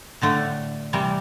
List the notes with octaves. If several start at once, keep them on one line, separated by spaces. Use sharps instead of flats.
A2 D3 A3
C3 E3 G3